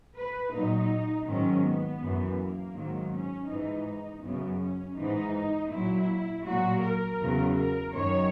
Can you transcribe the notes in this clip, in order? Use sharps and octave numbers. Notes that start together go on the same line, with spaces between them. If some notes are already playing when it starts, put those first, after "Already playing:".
B4
A#2 F#3 D#4
G#2 D#3 F#3 C#4
B3
F#2 E3
A#3
G#2 D#3 F#3
C#4
G#2 E3 D#4
F#2 C#3 F#3 B3
C#4
G#2 E3 D#4
A#2 F#3 E4
A#2 F#3 F#4
A#4
E2 C#3 F#3
A#4
F#2 D#3 F#3 C#5